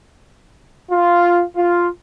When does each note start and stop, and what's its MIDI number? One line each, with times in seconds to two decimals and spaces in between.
0.91 1.42 65
1.56 1.87 65